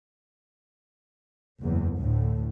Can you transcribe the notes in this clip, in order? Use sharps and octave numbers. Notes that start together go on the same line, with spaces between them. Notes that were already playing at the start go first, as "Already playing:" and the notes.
F#1 E2
D2 A2